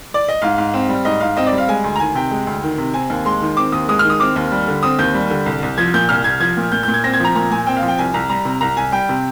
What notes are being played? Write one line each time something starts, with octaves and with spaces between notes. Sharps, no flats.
D5
D#5
G#2 F5
G#2
C4
G3
G#2 D#5
G#2 F5
C4 D#5
D5
G3
F5
G#3 G#5
D2
A#5
D#3 G#5
C3 G5
G#3
D2
D#3
C3
C4 G#5
D#2
G#3 C6
D#3
C4 D6
D#2 D#6
G#3 D#6
D#3 F6
D#6
C4 D6
D#2
G3
D3
C4 D#6
D#2 G6
G3
D3
C2
C2
F3 G#6
A#2 G6
C2 F6
C2 G#6
F3 G#6
A#2
A#2 G6
A#2 G6
G#6
C4 A#6
G#6
F3 A#5
A#2 A#5
A#2 G#5
C4 G5
F5
F3
G5
C2 G#5
C2 A#5
G3 A#5
C3
C2 A#5
C2 G#5
G3 G5
C3